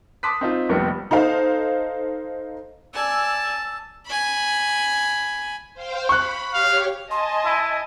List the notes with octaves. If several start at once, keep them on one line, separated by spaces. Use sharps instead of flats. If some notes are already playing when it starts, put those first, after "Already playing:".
A5 C6 D6 D#6 F#6 B6
C4 D#4 F4
F1 A#1 G3 B3 C#7
D#4 A4 C5 F5
D5 G#5 A5 E6
G#5 B5
C5 F5 G5
B5 C#6 F#6
G4 C#5 F5
D#5 G#5 A5 C6
E4